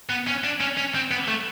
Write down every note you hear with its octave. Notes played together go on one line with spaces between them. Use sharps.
B3
C#4
D4
C#4
C#4
C4
B3
A3